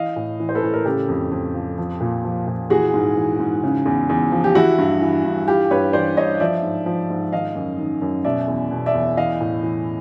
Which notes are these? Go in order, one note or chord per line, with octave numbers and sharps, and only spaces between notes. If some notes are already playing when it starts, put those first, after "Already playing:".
Already playing: E3 D#5 F5
A2
E3
C5
A4 B4
A2
A#4
C#3 G4 A4
F2
F2
F3
F3
A#2
F3
A#2
E3 F#4 G#4
G#2
E3
G#2
C#3
E2
E2
F3
G4
E3 E4 F#4
G2
E3
G2
E3 F4 G4
G2 B4 C#5
E3 C5 D5
G2 C#5 D#5
F3 D5 E5
G#2
F3
G#2
D#3 D#5 F5
F#2
D#3
F#2
B2 D5 E5
E2
B2
D5 E5
E2
E3 D#5 F5
A2
E3